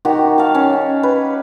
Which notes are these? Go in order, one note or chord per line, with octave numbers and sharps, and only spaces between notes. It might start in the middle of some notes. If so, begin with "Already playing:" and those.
D#3 F#4 G4
F5 A5
C#4
B4